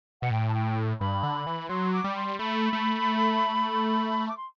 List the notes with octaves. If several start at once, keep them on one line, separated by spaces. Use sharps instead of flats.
B2 F#5
A2 G5
A5
G5
G2 B5
D3
E3
F#3 C6
D6
G3
C6
A3 B5
A3
D6
C6